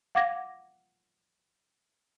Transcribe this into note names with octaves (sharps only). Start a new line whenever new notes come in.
F5 F#5 D6 G#6 A#6